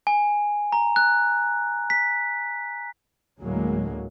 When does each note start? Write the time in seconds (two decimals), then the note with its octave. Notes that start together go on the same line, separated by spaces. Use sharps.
0.07 G#5
0.72 A#5
0.96 F#6
1.90 B6
3.40 D2 A2 F#3 G#3 A#3